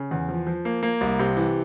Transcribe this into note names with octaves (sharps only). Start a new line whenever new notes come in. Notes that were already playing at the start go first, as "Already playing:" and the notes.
Already playing: C#3
E2
F3
F3
A#3
A#3
C2
C3
E3